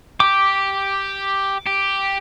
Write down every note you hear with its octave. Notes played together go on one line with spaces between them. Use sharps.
G4 D6
G4